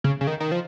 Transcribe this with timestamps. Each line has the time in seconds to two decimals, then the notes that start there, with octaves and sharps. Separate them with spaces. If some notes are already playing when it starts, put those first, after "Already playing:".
0.04 C#3
0.21 C#3
0.27 D#3
0.40 D#3
0.52 F3